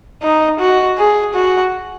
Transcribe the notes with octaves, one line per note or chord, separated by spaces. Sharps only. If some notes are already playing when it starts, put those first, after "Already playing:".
D#4
F#4
G#4
F#4